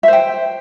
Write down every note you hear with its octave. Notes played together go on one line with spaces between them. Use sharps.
C5 E5 G5